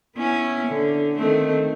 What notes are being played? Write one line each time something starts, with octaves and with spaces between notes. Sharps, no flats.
B3 C#4 E4
D3
D#3 A3 C4